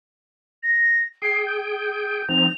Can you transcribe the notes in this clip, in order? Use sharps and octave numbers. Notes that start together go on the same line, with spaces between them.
A#6
G#4 G5 C7
G6
F3 C4 D#4 F7